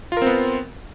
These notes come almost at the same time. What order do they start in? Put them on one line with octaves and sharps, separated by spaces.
F4 A#4 C4 B3